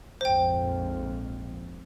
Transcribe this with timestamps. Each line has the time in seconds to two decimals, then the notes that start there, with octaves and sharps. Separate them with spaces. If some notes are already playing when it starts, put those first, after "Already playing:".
0.21 A#1 F2 G#2 C5 G5